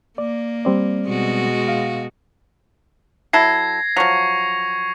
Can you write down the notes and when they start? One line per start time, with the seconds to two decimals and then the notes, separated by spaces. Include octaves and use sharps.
0.18 A#3 D5
0.65 G3 C4 D5
1.09 B2 G#3 F#4
1.68 F5
3.33 F#3 E4 A4 G#6 A#6 C7
3.97 F3 F#3 C#6 C#7 F7